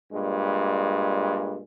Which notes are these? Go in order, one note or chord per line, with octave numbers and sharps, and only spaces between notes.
G2 A#2 G#3